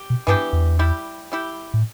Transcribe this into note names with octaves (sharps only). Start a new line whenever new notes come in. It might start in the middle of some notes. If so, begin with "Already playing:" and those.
Already playing: G4
B2
G2 E3 B3 D4 G4
E2
G3 E4 G4
G3 E4 G4
A2